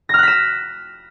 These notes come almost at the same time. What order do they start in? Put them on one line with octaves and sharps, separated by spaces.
A#6 F6 F#6 B6 E7